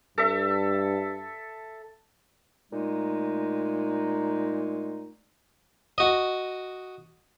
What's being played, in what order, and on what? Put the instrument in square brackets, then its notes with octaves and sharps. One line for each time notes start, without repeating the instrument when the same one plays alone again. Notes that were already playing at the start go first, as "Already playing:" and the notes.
[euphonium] G2 [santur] A4 E5
[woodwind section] A#2 G#3 A3 D#4
[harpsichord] F#4 D#5